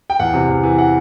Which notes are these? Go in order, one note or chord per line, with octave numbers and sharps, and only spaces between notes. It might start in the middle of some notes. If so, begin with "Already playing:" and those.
G5
E2 F#5
C3
E2
E3
F#5